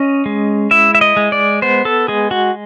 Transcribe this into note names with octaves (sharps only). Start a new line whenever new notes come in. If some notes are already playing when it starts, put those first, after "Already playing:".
Already playing: C#4 D#5
G#3
E4 E5
E5
D#5
G#3
D5
B3 C5
A4
G#3 G#4
F#4